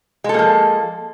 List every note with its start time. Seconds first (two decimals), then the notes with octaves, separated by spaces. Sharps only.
0.24 G#3
0.29 A4
0.34 A#3
0.39 F3